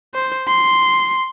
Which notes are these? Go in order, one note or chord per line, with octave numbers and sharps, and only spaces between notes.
C5
C6